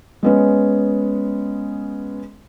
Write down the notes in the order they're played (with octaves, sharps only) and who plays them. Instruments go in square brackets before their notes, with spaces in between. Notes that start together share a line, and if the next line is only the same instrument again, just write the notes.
[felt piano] G#3 B3 C#4